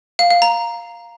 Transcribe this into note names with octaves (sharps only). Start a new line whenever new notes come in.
F5
F5
A#5